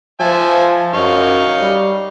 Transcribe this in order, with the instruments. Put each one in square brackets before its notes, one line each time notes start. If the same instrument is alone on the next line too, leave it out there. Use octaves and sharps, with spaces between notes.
[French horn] F3 [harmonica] E5 G#5 A5
[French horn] F#2 [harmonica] D#4 F5 C#6
[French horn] G3